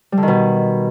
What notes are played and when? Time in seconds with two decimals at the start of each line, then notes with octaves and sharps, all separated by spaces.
0.12 G3
0.17 D3
0.23 D#3
0.28 B2